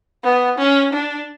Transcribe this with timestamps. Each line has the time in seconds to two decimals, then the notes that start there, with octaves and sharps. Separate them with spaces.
0.24 B3
0.58 C#4
0.93 D4